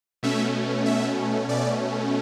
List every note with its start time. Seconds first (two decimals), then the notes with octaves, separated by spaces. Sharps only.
0.23 B2 A3 C#4 E5
0.86 E5
1.48 B2 A3 C#4 D5